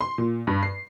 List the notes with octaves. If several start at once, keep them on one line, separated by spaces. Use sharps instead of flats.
C6
A#2
G2
C7